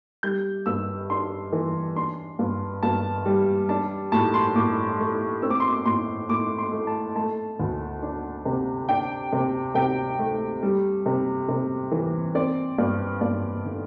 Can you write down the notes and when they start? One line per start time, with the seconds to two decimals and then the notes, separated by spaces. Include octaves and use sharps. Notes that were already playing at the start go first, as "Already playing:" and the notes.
0.23 G3 G6
0.66 G2 E6
1.10 D4 C6
1.52 E3
1.96 D4 C6
2.39 G2
2.83 G2 A5
3.26 G3
3.69 D4 A5
4.12 A2 A5
4.34 C6
4.55 A2 D6
4.99 A3
5.42 C4 E6
5.50 D6
5.60 C6
5.68 D6
5.85 A2 C6
6.29 A2 D6
6.59 C6
6.72 A3
6.87 A5
7.16 A3 A5
7.60 D2
8.02 D4
8.45 C3
8.89 D4 G5
9.33 C3
9.75 C3 G5
10.19 A3
10.63 G3
11.06 C3
11.49 C3
11.91 E3
12.35 C4 D5
12.78 G2 D5
13.21 G2 D5
13.65 D3